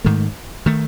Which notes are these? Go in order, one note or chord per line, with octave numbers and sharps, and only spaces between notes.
G#2 D#3 A3
D#3 A3